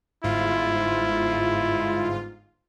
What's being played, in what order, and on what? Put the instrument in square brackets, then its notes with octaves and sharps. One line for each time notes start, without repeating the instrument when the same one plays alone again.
[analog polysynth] G1 G#2 F4 [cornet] E4